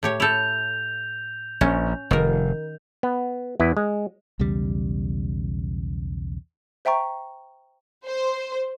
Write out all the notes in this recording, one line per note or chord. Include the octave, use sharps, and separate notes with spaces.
A2 G4 C#5
E4 A4 G6 F7
A#1 C#4
F1 D#3 A#4
B3
E2 E4 B4
G#3
B1 E2 C#3 G3
C5 E5 G5 A#5 C#6
C5